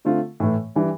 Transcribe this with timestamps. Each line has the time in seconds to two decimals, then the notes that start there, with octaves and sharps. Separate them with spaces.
0.05 D3 A3 C4 F4
0.40 A2 E3 A3
0.75 E3 G3 D4